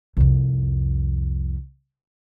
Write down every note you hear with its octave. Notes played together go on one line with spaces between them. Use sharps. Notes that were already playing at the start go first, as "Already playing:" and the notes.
C2 F2